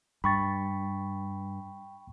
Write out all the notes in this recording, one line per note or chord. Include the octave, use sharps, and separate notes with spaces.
G2 G5 B5 C#6 A6